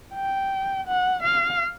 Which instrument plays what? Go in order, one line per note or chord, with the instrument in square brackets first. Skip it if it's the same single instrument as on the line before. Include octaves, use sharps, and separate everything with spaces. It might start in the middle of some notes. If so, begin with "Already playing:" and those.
[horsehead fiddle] G5
F#5
F5